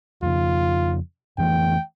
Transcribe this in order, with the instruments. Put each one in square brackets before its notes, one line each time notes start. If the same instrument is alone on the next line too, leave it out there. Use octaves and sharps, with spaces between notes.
[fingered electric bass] F2 C#3 [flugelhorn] F4
[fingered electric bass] F2 E3 A3 [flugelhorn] G5